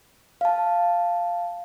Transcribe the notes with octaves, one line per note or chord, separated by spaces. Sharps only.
F5 A5